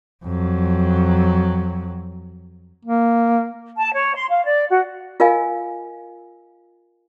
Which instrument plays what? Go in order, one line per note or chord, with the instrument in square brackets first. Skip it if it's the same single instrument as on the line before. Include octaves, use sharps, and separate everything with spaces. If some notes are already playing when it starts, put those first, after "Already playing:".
[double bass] F2 F#3
[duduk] A#3
[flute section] A5
C#5
C6
F5
D5
F#4
[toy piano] F4 A#4 D#5 F5 G#5